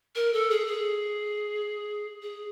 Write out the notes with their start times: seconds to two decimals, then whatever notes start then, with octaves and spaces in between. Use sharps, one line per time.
0.15 A#4
0.33 A4
0.50 G#4
0.66 G#4
2.22 G#4